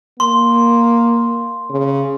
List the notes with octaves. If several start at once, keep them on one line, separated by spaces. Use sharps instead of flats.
A#3 C6
C#3